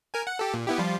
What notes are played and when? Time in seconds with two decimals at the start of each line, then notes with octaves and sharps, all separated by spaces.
0.14 A#4 G#5
0.27 F#5
0.39 G4 A4
0.54 A#2
0.67 B3 E4 G4
0.78 F3 G3 F4